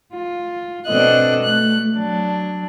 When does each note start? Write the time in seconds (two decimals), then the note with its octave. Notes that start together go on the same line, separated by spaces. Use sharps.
0.13 F4
0.88 B2 C4 D4 A4 D#5 F#6
1.43 A3 F#6
1.95 F#3 D4